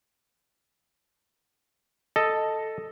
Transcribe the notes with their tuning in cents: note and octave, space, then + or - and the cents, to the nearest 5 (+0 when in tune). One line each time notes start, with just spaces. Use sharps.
A4 +0 D#5 +0